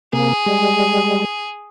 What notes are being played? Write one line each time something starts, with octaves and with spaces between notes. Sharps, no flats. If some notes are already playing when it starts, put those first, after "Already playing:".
C3 A#3 G#4
G3 G#3